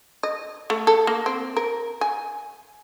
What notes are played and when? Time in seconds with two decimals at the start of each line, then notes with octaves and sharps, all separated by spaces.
0.23 D#5
0.70 A3
0.87 A4
1.07 A#3
1.26 C4
1.57 A#4
2.01 G#5